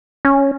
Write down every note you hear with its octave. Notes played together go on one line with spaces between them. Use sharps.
C#4